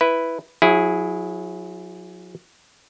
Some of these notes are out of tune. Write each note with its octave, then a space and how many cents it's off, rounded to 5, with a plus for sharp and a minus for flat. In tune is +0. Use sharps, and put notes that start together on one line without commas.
E4 +0 B4 +0
F#3 -35 E4 +0 G#4 +0